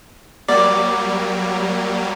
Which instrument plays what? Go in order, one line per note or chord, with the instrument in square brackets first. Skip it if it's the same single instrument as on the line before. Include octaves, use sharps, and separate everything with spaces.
[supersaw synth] F#3 G3 A#3 [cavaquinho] D5